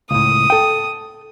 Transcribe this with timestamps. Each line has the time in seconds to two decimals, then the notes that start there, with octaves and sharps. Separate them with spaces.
0.11 C#2 A2 D#6
0.50 A4 G5